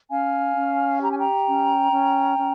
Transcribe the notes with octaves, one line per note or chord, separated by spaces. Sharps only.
C#4 F5 G#5
C#4
G4 A#5
G#5
G5 A#5
C#4
C#4
C#4